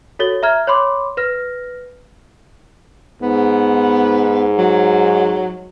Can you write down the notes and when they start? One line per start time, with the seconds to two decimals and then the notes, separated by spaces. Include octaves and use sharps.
0.19 F#4 A4 C#5 A6 G7
0.43 E5 A#5 F6 G#6
0.67 C#5 B5 C6 D6
1.17 B4 F6 A#6
3.22 G#2 B3
4.58 F#3